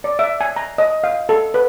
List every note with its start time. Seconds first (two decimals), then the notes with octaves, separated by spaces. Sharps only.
0.04 D5
0.19 E5
0.41 G#5
0.56 A#5
0.78 D#5
1.04 F5
1.29 A4
1.54 B4